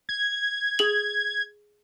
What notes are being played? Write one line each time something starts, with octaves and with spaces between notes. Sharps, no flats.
G#6
G#4 F#7